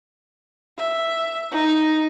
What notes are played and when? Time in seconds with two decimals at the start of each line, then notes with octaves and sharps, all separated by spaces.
0.78 E5
1.51 D#4